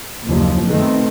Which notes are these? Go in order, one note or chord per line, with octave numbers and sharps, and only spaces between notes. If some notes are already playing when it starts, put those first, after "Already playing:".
F#1 D#2 F3
B2 D#3 A3 C4